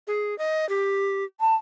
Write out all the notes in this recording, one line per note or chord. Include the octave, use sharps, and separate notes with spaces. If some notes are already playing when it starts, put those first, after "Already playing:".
G#4
D#5
G4
A5